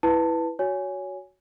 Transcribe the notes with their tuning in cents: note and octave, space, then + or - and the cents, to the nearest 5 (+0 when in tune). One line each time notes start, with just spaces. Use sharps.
E4 +0 B4 +0 A5 +15
F#4 +0 C#5 +20 G#5 +0